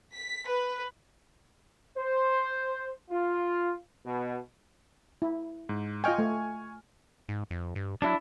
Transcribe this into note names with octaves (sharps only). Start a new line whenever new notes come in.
B6
B4
C5
F4
B2
E4
G#2
F4 D#5 G5 G#5 C#6 F6
A3
G#2
F2
G2
F#3 D4 E4